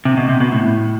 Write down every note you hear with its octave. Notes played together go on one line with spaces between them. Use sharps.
C3
B2
C3
B2
A2